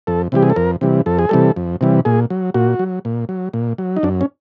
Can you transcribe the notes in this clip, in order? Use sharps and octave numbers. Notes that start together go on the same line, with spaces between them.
F2 A4
C3 E3 G3 G4
G#4
A4
F2 A#4
C3 E3 G3
F2 A4
G#4
C3 E3 G3 A4
F2
C3 E3 G3
A#2 G#4
F#3
A#2 F#4
F#3
A#2
F#3
A#2
F#3
D#4
F#2 D4
C#4